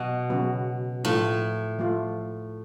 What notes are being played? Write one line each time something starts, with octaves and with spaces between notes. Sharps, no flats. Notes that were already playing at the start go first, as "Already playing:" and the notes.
Already playing: B2 F#3
C#3 F#3 B3 F#4
A2 F3 A3 F4
F3 A3 F4